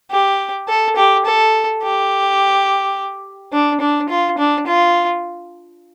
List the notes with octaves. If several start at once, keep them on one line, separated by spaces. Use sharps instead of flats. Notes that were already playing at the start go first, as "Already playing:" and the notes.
G4
A4
G4
A4
G4
D4
D4
F4
D4
F4